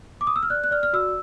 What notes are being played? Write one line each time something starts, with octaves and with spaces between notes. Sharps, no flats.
D6
D#6
E6
F6
D5 F#6
F#6
D5 F6
F6
F#4 E6